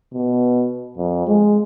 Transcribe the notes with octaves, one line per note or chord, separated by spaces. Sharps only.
B2
F2
G#3